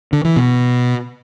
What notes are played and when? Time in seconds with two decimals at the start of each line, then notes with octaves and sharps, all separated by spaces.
0.13 D3
0.25 E3
0.36 B2